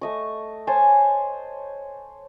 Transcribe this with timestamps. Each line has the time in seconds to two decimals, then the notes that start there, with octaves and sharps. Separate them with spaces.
0.01 A3 D#5 C#6
0.67 C5 C#5 G#5 A5